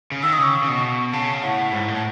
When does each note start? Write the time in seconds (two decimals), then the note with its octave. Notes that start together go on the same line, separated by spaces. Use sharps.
0.12 C#3
0.23 D#3 E6
0.33 D#6
0.38 C#3
0.43 C#6
0.63 C#3
0.68 B2
1.13 C#3 A5
1.42 A2 F#5
1.73 G#2
1.88 A2
1.96 A5